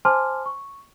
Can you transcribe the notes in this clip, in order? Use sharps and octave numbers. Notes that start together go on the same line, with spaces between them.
C5 G#5 A5 C6 D6 F6
C#6